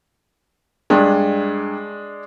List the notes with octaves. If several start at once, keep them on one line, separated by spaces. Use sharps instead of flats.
G2 G#3 D4